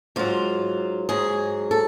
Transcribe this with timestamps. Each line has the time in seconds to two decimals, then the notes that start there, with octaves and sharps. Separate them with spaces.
0.16 G#2 F#3 F4
1.09 G#2 F#3 G#4
1.71 A4